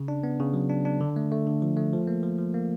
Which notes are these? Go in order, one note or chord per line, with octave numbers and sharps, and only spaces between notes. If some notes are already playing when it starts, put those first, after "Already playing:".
Already playing: C#3
D4
B3
C#3
F#3
D4
D4
D3
A3
A3
D3
F3
A3
F3
A#3
F3
F3
A#3